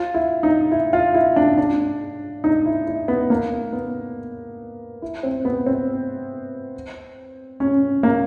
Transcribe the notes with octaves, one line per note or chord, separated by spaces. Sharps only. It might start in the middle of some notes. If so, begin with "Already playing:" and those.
Already playing: F4
E4
D#4
E4
F4
E4
D4
D4
D#4
E4
E4
B3
A#3
B3
E4
C4
B3
C4
C#4
A#3